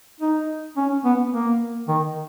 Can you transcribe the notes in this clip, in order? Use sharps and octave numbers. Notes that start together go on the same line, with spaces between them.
D#4
C#4
B3
A#3
D#3